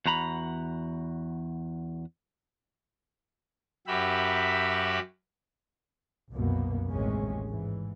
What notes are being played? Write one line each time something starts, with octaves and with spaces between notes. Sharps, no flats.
E2 F#4 A#5 B5
F#2 F#3 G4 E5 B5
C2 F#2 B2 A#3 B3
A1 D#2 C3 G#3 C#4
G#2 E3